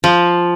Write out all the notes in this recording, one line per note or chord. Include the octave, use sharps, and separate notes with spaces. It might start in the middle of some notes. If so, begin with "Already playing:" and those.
F3